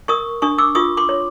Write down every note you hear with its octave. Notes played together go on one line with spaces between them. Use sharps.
A#4 C#6 D#6
D4 C#6 D#6
D6 E6
F4 C#6 D#6
C6 D6
C#5